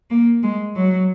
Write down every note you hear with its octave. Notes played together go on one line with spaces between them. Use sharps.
A#3
G#3
F#3